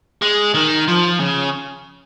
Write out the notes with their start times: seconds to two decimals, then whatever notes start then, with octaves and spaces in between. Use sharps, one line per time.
0.22 G#3
0.55 D#3
0.88 F3
1.20 C#3